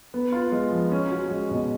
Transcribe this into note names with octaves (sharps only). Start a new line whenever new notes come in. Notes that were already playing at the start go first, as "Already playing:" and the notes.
B3
F4
G#3
F3
C#4
F#4
G#3
B2